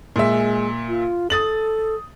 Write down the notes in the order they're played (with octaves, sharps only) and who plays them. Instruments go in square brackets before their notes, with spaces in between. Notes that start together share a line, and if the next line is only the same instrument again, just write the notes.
[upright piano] A#2 E5 [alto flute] G#3
[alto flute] F4
[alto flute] A4 [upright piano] D#6 A6 F#7